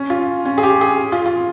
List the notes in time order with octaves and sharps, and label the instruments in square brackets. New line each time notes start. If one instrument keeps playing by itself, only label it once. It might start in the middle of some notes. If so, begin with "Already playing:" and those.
Already playing: [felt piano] C#4
F4
C#4
G#4
G4
G#4
F4
F4